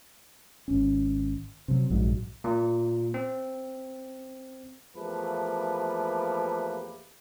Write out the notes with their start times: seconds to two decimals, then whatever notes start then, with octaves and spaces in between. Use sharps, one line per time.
0.68 G#1 C#4
1.68 C3 F#3
1.90 A#1 G#2 F#3
2.44 A#2
3.14 C4
4.96 E2 F3 A3 A#3 G4 B4